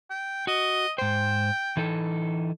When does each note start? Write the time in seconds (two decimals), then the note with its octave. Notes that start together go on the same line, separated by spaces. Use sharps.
0.10 G5
0.47 F#4 D#5
0.98 G#2 C5 G5
1.77 E3 D#4 A4